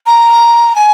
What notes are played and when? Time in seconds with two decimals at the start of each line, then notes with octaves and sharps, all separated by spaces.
0.06 A#5
0.76 G#5